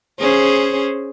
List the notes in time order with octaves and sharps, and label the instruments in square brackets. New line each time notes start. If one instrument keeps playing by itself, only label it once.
[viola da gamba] C#4 G#4 C5